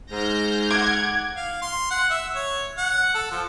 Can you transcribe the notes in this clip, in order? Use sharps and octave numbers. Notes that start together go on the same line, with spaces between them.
G#2 F6 G6 A#6
F#5 D6 G#6
F5
C6
F#5
E5
C#5
F#5
A4
F3